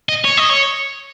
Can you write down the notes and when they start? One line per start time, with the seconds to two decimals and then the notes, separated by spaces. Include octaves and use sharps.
0.09 D#5
0.24 C#5
0.37 D#5
0.49 C#5